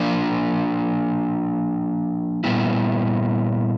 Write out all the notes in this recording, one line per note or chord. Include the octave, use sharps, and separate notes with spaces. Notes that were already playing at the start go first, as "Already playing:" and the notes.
Already playing: F3 A#3 D4
A#2 G3 B3 E4